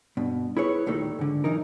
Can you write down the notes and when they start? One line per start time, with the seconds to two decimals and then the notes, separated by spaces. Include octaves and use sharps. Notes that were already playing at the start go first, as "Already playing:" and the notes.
0.17 G2 B2
0.57 E4 G#4 B4 C#5
0.86 D#2 A#2 D#3 A3
1.19 G#2 D3
1.44 B1 E3 D#4 A#4